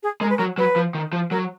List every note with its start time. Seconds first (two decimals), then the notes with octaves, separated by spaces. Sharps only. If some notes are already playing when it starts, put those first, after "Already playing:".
0.03 G#4
0.21 G#3 A#4
0.29 B4
0.37 F#3 A#4
0.58 F#3 B4
0.76 F3
0.95 D#3
1.13 F3
1.31 F#3 A#4